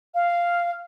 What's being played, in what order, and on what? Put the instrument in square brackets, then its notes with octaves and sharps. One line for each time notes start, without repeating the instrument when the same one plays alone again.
[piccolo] F5